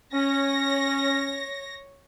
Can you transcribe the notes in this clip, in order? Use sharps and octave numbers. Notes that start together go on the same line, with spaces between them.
C#4 C#5 A#6